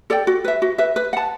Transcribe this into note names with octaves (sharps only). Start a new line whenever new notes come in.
A4 D5 G5
F#4
B4 E5
F#4
B4 E5
B4
F#5 A5